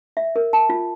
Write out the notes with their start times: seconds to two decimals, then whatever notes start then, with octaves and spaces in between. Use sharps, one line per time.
0.17 E5
0.36 A#4
0.53 A5
0.69 F4